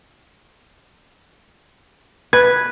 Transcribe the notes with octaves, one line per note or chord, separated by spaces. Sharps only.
B4 G#6